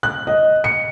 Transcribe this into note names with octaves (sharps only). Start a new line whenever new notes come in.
F#6
D#5
C#7